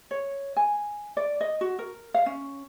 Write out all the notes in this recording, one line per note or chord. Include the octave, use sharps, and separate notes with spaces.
C#5
G#5
D5
D#5
F#4
A#4
F5
C#4